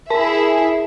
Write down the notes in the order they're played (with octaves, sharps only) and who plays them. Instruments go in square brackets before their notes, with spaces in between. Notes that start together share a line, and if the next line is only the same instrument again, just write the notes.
[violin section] E4 G#4 E5 [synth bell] A#4 A5